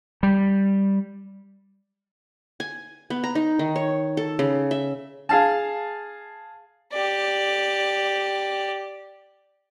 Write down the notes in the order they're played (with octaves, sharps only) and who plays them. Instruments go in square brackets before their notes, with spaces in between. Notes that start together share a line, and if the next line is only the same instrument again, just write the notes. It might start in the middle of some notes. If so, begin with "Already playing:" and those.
[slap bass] G3
[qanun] G#5
B3
A#5
D#4
D#3
C#5
A4
C#3
E5
[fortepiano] G#4 F5 A5
[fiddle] G4 D5